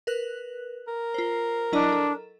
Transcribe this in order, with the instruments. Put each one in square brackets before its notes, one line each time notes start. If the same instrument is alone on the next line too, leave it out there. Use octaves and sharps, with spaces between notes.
[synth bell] A#4 B4 F#6
[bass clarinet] A#4
[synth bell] F4 C5
[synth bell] F#3 E4 D#5 [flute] D4
[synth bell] A4